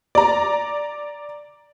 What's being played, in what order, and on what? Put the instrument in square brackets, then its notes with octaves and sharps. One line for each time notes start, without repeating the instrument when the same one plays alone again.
[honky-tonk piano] D5 A#5